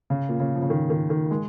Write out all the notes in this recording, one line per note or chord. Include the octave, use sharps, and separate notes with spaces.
C#3
A#2
C#3
F3
C#3
D#3
D#3
D#3
G#3